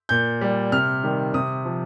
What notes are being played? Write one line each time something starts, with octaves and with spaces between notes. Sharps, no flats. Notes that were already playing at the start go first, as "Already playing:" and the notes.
A#2 G6
G3
C3 F6
D#3 G3
C3 D#6
F3